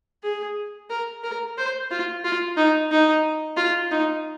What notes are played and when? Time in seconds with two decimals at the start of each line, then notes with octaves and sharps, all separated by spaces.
0.23 G#4
0.90 A#4
1.24 A#4
1.58 C5
1.91 F4
2.24 F4
2.57 D#4
2.91 D#4
3.57 F4
3.91 D#4